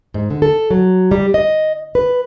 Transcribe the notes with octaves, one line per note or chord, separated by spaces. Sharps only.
G#2
D3
A4
F#3
G3
D#5
B4